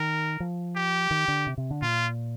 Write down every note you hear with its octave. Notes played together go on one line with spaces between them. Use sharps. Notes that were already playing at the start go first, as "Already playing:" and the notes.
Already playing: D#3 A#4
F3
G4
D#3
D3
C3
C3
D3
A#2 F4